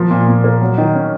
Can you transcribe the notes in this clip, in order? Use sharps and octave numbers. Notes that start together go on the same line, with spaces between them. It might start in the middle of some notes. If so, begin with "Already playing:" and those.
Already playing: F3 A#3
A#2
A#2
A#3
F#3
D#3
C#4